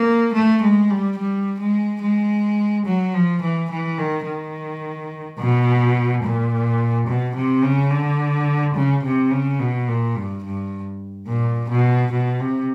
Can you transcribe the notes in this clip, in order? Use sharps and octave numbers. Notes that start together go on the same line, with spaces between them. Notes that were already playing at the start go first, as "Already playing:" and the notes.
Already playing: A#3
A3
G#3
G3
G3
G#3
G#3
F#3
F3
E3
E3
D#3
D#3
B2
A#2
B2
C3
C#3
D3
C#3
C3
C#3
B2
A#2
G2
G2
A#2
B2
B2
C3